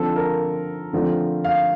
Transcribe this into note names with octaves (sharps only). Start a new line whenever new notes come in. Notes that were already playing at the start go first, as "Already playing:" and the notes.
Already playing: D3 F3 C4 A4
A#4
D3 F3 A3 C4
F5